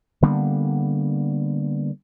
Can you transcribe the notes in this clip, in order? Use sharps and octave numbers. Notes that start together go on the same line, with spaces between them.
D3 G3 A#3 B3